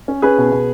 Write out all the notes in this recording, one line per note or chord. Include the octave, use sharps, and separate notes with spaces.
C#4
C#4 G#4 B4
B2
B2